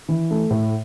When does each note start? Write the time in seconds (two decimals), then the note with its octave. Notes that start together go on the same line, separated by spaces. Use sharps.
0.09 E3
0.31 A3
0.50 A2